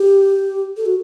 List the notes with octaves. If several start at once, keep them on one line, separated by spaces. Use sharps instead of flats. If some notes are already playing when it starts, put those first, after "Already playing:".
Already playing: G4
A4
F#4